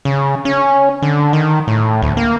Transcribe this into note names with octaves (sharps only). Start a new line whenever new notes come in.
C#3
C#4
D3
D#3
A2
D2
A#3